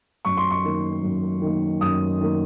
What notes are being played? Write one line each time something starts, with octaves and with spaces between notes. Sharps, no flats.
F#2 C#6
C6
C#6
D#3 A#3
F#2
D#3 A#3
F#2 D#6
D#3 A#3